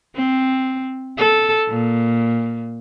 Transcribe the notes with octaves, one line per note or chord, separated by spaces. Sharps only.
C4
A4
A#2